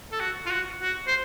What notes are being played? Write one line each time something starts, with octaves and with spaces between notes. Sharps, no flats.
A4
F#4
F4
F#4
F#4
C5